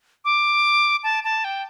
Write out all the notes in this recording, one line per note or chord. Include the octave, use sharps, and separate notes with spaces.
D6
A5
A5
G5